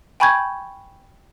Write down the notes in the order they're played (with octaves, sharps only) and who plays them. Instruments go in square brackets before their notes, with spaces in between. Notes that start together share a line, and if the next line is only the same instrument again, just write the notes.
[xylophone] G5 G#5 B5 C#6 G6 G#6